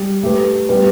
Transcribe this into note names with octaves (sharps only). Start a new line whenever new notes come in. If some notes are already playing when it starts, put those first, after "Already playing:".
Already playing: G3
A3 G4 B4
G3 B3 G4 B4